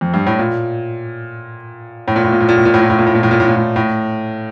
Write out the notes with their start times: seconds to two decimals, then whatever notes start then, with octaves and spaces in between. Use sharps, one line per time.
0.01 F2
0.14 G2
0.27 A2
0.39 A#2
2.08 A2
2.16 A#2
2.24 A2
2.32 A#2
2.40 A2
2.49 A#2
2.57 A2
2.65 A#2
2.74 A2
2.82 A#2
2.90 A2
2.99 A#2
3.07 A2
3.15 A#2
3.23 A2
3.31 A#2
3.40 A2
3.48 A#2
3.56 A2
3.76 A2